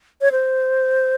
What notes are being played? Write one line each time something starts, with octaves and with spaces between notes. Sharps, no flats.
C#5
C5